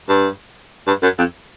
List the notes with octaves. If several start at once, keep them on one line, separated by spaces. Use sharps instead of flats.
G2
G2
F#2
F2